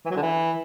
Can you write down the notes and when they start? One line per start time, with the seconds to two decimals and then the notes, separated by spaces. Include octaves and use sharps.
0.05 E3
0.11 F#3
0.16 D3
0.22 E3